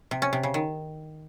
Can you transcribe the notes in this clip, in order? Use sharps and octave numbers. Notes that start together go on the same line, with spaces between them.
C3
C#4
C3
C#3
D#3